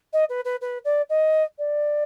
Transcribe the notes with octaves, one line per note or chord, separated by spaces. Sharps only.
D#5
B4
B4
B4
D5
D#5
D5